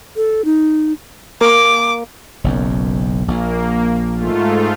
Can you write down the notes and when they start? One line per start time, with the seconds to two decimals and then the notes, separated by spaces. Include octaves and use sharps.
0.16 A4
0.45 D#4
1.41 A#3 D6
2.44 F#1 B1 F#2
3.28 A#1 A#3
4.15 G#2 A3 F4